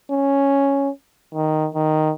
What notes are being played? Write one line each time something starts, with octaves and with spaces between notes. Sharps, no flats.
C#4
D#3
D#3